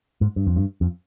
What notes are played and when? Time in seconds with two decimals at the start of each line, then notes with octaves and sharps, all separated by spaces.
0.21 G#2
0.36 G2
0.47 F2
0.56 G2
0.81 F2